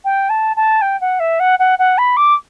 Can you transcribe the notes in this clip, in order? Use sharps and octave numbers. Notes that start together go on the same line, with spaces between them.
G5
A5
A5
G5
F#5
E5
F#5
F#5
F#5
B5
D6